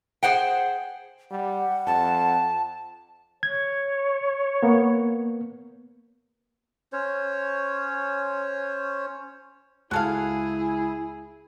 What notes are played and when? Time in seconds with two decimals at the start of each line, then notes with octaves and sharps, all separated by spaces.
0.23 G#4 C5 F#5 G5
1.31 G3 F#5
1.87 F2 A5
3.43 C#5 G#6
4.63 A#3 B3
6.93 C#4 C5 C#5
9.91 C#2 E4 F#4 G#4 A4 F5